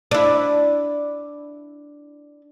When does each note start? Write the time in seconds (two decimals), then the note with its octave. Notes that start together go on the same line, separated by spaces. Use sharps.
0.11 D4 E4